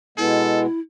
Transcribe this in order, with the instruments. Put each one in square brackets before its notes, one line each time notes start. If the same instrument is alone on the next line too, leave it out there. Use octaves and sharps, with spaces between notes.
[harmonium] B2 G#3 B3 [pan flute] E4 [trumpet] A4